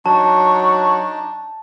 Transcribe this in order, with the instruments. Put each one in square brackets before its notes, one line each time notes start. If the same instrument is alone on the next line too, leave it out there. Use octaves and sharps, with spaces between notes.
[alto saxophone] F#3 [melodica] D4 D#4 [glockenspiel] A5 [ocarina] C#6